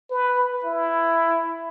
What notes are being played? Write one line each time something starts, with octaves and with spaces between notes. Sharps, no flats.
B4
E4